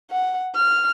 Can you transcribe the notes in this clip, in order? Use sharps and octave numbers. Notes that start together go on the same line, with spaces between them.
F#5
F6